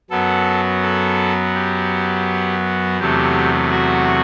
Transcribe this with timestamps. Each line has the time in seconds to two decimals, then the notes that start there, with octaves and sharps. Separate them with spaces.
0.10 F#2 F#3 B3 A4
0.82 A4
1.55 G4
2.99 E2 C3 F#3 A3 G4
3.71 F#4